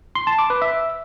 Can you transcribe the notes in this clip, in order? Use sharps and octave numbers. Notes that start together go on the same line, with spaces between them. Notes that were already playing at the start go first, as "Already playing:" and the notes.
C6
A5
D6
B4
E5